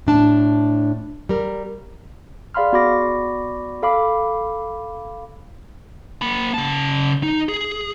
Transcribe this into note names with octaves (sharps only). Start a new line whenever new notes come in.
A2 D4 A5
G3 A#4
G#4 D5 F5 B5 C6 F6
B3 F#4 D5 B5 D6 A#6
A4 F5 B5 D6
A#3 B5
C#3 A5
D#4
G#4